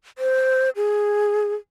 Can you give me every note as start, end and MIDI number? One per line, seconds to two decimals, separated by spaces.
0.18 0.70 72
0.76 1.54 68